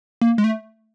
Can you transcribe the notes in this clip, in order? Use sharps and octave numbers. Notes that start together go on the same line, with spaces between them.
A#3
G#3
A3